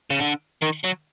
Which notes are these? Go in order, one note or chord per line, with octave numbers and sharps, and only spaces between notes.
C#3
D3
D#3
F#3